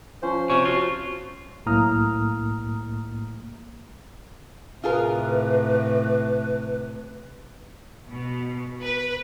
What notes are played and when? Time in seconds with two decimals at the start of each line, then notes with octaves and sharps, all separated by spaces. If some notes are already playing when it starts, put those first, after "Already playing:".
0.23 F3 C#4 C5 C6
0.50 C3 C#5
0.65 F4 F#4
1.66 B1 A2 A#3 A#5 D#6 F6
4.84 A2 C3 F4 G#4 A#4 B4
8.10 B2
8.82 B4